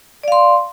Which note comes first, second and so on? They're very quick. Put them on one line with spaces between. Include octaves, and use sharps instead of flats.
D5 F5 C6